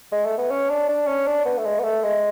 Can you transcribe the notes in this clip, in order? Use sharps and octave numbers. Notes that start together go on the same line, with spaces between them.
G#3
A3
B3
C#4
D4
D4
C#4
D4
B3
A3
G#3
B3
A3
G#3